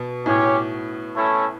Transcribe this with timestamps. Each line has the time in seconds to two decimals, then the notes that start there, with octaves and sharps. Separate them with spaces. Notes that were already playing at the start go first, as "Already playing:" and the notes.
Already playing: B2
0.26 A2 C#4 G4 C#5
1.15 A3 C#4 E4 A4 C#5